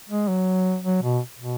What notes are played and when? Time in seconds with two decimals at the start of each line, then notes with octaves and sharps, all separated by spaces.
0.10 G#3
0.28 F#3
0.84 F#3
1.02 B2
1.39 B2